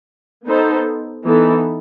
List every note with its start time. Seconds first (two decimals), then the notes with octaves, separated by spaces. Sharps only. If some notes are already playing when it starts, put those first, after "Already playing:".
0.45 B3 D#4 A4 C5
1.23 E3 B3 D#4 A4